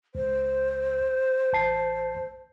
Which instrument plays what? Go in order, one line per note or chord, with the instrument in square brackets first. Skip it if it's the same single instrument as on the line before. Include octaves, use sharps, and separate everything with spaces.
[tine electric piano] C#2 [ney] C5
[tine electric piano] A1 A5 C7